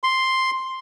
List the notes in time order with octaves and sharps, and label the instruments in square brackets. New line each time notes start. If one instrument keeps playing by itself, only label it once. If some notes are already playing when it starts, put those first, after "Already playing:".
[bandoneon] C6